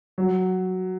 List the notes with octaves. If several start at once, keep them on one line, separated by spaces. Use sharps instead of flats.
F#3